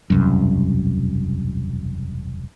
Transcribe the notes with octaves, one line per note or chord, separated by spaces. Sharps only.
E1 C2 F#2